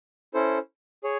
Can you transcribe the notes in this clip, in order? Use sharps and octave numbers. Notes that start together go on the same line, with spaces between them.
C#4 E4 A4 C5
G#4 C#5